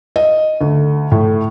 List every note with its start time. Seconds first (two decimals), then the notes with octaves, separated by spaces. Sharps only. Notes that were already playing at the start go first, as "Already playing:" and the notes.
0.16 D#5
0.61 D2
1.12 A2